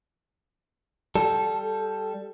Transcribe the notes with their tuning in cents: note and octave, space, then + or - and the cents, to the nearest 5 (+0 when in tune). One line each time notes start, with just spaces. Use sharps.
G3 +0 A4 -10